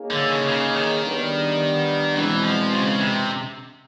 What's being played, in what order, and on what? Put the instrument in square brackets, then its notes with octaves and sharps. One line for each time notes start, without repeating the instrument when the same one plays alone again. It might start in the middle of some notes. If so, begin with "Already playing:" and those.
Already playing: [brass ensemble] A#3 D#4 G#4 C#5
[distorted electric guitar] D3
C#3
C#3
D#3
[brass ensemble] G3 B3 D4
[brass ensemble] E2 B2 G#3 C4 [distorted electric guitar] E3
[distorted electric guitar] F3
C#3
C3